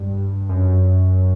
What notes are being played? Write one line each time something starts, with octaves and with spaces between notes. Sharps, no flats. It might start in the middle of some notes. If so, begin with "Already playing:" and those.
Already playing: G2
F#2